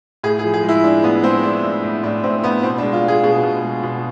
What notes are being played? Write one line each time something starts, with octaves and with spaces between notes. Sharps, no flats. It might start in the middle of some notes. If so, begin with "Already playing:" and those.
A2 G#4
G#4
F3
G#4
G#3
E4
G#3 D4
A2 B3
G#3 C4
G#3 D4
A2
A2
A2 D4
A2 C4
A2 B3
B2 C4
D4
G#3
F4
G#3
G#4
B2 G#4
B2
G#3
B2